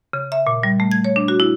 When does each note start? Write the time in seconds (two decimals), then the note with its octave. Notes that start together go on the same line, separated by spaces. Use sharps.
0.13 C#3
0.32 E5
0.47 A#2
0.63 G3
0.80 A3
0.92 G#6
1.04 C#5
1.16 D4
1.28 F#4
1.40 E4